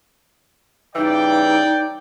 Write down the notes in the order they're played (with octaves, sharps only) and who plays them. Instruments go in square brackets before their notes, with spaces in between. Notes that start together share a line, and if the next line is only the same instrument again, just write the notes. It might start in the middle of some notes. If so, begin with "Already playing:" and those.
[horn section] G2 C#3 E3 [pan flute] D#4 [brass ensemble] D5 G5